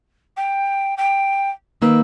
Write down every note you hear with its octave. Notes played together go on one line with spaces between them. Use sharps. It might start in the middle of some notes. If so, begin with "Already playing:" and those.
G5
G5
D#3 A#3 B4 E6